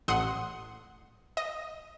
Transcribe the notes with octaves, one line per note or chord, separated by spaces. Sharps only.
A1 F#5 C6 D#6
D#5